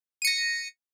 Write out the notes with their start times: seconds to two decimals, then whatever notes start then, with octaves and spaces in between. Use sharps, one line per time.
0.22 D#7
0.25 C#7
0.27 A#6